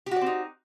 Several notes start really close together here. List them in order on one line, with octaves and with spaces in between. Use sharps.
G4 F#4 D5 C4 D#4